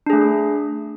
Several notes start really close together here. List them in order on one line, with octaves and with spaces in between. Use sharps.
D4 G#4 A3